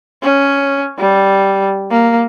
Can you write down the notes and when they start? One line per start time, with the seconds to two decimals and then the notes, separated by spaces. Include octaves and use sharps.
0.23 C#4
0.98 G3
1.91 A#3